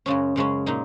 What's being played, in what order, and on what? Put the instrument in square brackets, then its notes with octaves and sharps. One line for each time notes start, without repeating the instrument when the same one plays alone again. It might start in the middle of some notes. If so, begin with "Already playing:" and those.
[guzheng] F#2 C#3 G#3 C#4
F#2 C#3 G#3 C#4
A#2 G#3 D#4